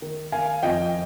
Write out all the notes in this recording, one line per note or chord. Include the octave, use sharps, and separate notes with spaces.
D#3
D#3 F5 G#5
F2 D#5 G5